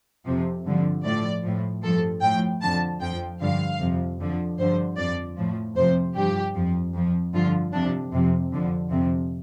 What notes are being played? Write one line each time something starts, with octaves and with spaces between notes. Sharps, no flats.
F2 C3 F3
G2 D3 F3
A2 F3 D5
A2 F3
G2 F3 A4
A2 F3 G5
F2 D3 F3 A5
F2 F3 G5
G2 D3 F3 F5
F2 C3 F3
F2 D3 F3
G2 D3 F3 C5
F2 F3 D5
A2 F3
F2 C3 F3 C5
G2 F3 G4
F2 F3
F2 F3
G2 D3 F3 F4
F2 C3 F3 D4
F2 C3 F3
F2 D3 F3
F2 C3 F3